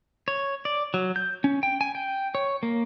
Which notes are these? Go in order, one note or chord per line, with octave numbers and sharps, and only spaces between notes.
C#5
D5
F#3
G6
C#4
G5
G#5
G5
C#5
A#3